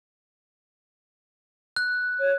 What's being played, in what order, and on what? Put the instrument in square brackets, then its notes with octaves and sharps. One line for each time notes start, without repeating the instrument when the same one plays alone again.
[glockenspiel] F#6
[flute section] C#5